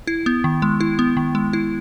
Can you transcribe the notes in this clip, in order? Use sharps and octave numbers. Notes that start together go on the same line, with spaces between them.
E4
B3
D#3
G#3
E4
B3
D#3
G#3
E4